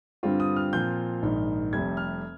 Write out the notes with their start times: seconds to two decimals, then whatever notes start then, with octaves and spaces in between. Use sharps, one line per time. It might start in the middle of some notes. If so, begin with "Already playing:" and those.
0.23 G2 D3 G3 C4 F4
0.40 D#6
0.56 F6
0.73 A#2 F3 C4 F4 G6
1.22 A#1 G#2 D#3
1.73 F1 F2 C3 G3 G#6
1.97 F6